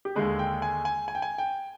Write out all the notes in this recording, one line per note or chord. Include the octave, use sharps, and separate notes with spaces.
G4
D#2 D3 G#3 G#4
G5
G#5
G#5
G#5
G5
G#5
G5